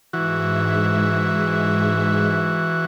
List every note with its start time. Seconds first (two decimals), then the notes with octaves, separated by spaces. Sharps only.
0.13 G#2 E3 G#3 F#4 E5